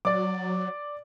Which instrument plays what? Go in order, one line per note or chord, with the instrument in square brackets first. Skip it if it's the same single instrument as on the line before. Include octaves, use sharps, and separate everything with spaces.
[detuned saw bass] F#3 [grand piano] D5 D6